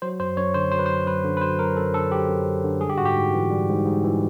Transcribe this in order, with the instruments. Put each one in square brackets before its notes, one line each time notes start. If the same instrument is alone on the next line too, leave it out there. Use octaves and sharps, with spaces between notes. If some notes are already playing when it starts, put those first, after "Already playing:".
[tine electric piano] F#3 C5
F#2 C5
F#2 C#5
D3 C5
F#3 C5
B4
C5
F#2
F#2 B4
D3
B4
F#3 C5
F#2 A#4
F#2 A4
D3 A4
F#3 G4
F#2
F#2
D3
G3 G#4
G4
G#2 F#4
G4
G#2
E3
G3
G#2
G#2
E3